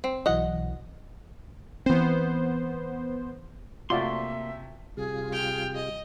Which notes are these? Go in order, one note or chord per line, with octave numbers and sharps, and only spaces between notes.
C4
B1 E3 F#3 D#5 F#5
E3 B3 C4 C5
C3 A3 A#3 F4 F#4 D5 E5 C6
C3 G3 F4 G#4
G5 F6
D#5